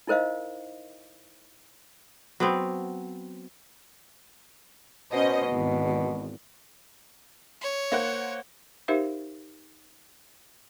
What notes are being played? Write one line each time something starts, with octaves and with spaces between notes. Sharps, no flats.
D#4 E4 A#4 C5 D#5 F5
F#3 B3 C4
B2 C#4 C5 D#5
G#1 E2
C#5
A#3 C5 F#5
D#4 G4 A#4 C5 E5 F5